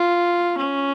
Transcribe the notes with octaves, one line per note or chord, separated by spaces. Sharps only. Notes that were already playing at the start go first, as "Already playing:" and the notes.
Already playing: F4
C#4